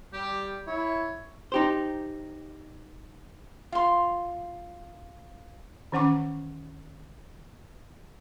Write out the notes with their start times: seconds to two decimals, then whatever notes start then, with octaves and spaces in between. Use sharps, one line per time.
0.13 G3 G4
0.67 E4 C#5
1.52 D#4 G4 C5
3.72 F4 C6
5.92 D#3 E3 C#4 F#5 C#6 D6